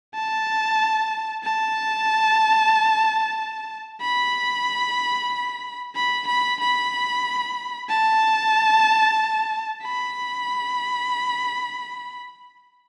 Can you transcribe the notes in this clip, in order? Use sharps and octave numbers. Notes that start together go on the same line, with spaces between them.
A5
A5
B5
B5
B5
B5
A5
B5